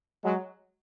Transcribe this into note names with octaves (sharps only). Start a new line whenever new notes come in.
F#3 G#3